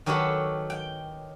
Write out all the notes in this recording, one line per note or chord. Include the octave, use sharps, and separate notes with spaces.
D#3 F#3 G4 A4 B4 C#5
G5